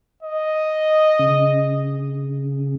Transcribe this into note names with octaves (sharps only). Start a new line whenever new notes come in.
D#5
C#3